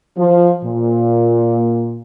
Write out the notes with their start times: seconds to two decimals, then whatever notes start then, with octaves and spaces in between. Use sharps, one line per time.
0.17 F3
0.64 A#2